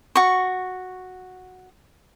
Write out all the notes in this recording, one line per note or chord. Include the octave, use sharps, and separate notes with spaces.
F#4 C#6